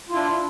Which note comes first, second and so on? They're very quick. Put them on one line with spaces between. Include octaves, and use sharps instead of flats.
F4 E4 D4